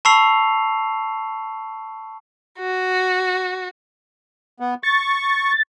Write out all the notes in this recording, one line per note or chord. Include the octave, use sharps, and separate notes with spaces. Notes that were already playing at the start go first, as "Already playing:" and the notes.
A5 B5 C#6 E6 C7 F7
F#4
B3
C#6 A6